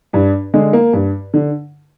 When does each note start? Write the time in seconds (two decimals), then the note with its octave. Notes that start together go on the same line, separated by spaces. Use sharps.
0.13 G2 D4
0.54 D3 G#3
0.73 A#3
0.93 G2
1.34 D3